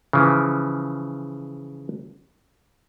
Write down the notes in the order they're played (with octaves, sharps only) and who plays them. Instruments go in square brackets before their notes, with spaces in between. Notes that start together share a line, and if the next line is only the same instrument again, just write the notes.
[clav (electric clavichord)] C#3 E3 F3